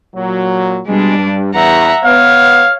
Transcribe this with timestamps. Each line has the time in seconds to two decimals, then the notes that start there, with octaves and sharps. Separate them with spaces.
0.15 A#2 F#3
0.86 B2 G3 G#3 D4
1.18 G2
1.53 E2 E5 F#5 A#5
2.04 B3 C#5 F5